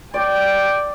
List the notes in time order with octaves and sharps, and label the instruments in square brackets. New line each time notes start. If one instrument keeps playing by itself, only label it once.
[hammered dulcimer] D5 [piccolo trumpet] G5